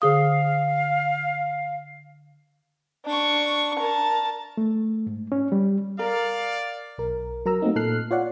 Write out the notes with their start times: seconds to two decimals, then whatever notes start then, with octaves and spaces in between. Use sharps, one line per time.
0.02 D3 G#4 F5 D#6
3.06 D4 C#6
3.79 A#4 A5
4.57 A3
5.07 G#2
5.32 C#4
5.52 G3
5.99 A#4 D5 F5
6.98 B1 A#4
7.45 F#3 A#4 A#5 E6
7.61 A3 A#3 C4 D#4 F#4
7.76 A#2 A4 F6 F#6 C7
8.11 F4 C#5 D5 F#5